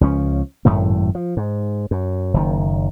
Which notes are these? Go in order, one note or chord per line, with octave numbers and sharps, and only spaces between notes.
C#2 F3 C#4
G#1 F#2 A2 A3
F3
G#2
F#2
F#1 D#3